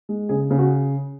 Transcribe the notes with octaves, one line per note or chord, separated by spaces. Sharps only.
G#3
C#3 G#4
C#3
F#4